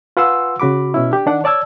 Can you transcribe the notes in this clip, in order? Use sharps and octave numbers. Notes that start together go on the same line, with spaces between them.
F4 B4 F#5 G#5 C6 E6
C#3 F#4 B5 D6
B2 C#4 E4
D4 G4
D#3 D4 F#5
C#5 D5 A5 E6 G#6